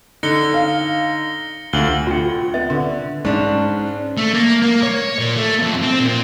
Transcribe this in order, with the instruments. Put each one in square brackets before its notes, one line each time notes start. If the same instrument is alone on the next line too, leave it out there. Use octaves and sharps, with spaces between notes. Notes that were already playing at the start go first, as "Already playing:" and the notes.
[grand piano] D3 [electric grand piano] D#4 [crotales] A#6 C#7 G7
[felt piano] F5
[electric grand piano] D2 [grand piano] F4 [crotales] F#7 G7
[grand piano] D2 [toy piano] F4 G5
[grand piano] B3 [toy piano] E5
[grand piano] D3
[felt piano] G#2 [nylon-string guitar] C#4 D4
[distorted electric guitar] A3
A#3
A#3
C#5
A#2
A3
F2
C4
A#2